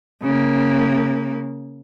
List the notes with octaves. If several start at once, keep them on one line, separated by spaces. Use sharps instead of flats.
C#3 A#3